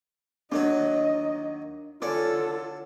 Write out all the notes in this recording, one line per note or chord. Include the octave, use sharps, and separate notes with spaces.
D#2 D#3 F#3 D4 D#5
D3 C#4 F4 A4 D5